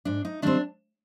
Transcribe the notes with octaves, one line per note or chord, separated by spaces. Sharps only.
G#2 D4
D#4
D#3 G3 C4 D4